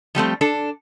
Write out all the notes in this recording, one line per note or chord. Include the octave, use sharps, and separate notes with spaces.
F3 G3 A3 C4
D4 A4